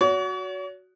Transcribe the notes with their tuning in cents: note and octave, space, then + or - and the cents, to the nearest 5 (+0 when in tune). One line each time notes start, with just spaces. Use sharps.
F#4 +0 C#5 +40